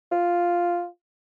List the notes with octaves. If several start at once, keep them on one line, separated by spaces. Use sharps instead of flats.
F4